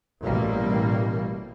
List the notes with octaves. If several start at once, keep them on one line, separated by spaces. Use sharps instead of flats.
A1 B2 G3 A#3